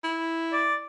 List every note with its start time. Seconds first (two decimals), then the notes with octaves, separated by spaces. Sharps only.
0.04 E4
0.53 D5